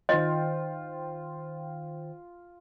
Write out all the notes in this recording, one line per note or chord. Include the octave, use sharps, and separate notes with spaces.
D#3 F4 C5 D#5 G5